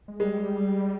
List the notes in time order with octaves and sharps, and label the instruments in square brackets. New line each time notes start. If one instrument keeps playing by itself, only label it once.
[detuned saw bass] G#3
[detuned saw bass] G3 [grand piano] G#3